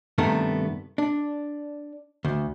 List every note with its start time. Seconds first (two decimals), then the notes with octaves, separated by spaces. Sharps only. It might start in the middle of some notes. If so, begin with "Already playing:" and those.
0.18 G2 C3 D#3 A3 B3
0.98 D4
2.25 D2